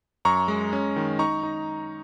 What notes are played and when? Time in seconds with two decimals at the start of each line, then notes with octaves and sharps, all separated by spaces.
0.25 F#2 A#5 C#6
0.48 G#3
0.73 C#4
0.96 D#3
1.19 D#4 A#5 C#6
1.43 D#4